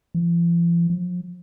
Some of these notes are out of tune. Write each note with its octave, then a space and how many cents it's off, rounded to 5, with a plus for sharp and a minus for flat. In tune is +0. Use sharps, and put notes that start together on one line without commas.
F3 -45
F3 +35